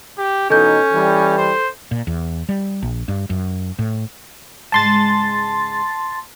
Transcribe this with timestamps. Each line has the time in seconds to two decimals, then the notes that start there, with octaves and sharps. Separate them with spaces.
0.18 G4
0.50 B2 E3 C#4 D#4 A4 G6
0.92 E3 G3
1.38 C5
1.91 A#2
2.07 E2
2.49 G3
2.83 A#1
3.08 G2
3.30 F#2
3.79 A2
4.72 G#2 C#3 G#3 A5 C6 A6